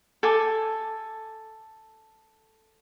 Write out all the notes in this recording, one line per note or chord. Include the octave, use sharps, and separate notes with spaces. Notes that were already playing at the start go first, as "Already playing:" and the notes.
A4 G#5 D6